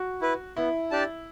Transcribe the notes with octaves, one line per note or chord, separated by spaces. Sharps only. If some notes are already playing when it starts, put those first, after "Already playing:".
Already playing: F#4
E4 B4
B3 E4
D4 G4 D5 A5